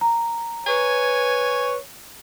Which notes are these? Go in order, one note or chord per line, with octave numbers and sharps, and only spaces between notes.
A#5
B4 C#5 G#5